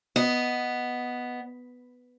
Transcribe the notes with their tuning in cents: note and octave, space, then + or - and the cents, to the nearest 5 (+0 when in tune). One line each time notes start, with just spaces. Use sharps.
B3 +0 D#5 +5